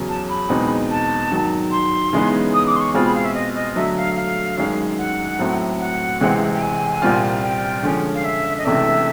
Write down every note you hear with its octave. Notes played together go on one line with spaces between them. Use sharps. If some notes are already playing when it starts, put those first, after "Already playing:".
Already playing: E2 C#3 F#3
A5
B5
E2 B2 G#3 C4 D#4
A5
G#2 D#3 F#3
C6
C#3 E3 G#3 B3 D#4
D#6
D6
C6
C#6
B2 G#3 C4 F4 B5
B5
F5
E5
D#5
D#5
D3 F#3 A3 E5
F5
F5
F#2 D#3 G#3
F#5
A2 F#3 A3 C4
F#5
C#2 C3 E3 G#3 C4
G5
G#5
C2 A#2 G3 C4 F4
G5
D3 F3 G#3 C#4
F5
E5
D#5
C#2 C3 E3 A3 D4 E5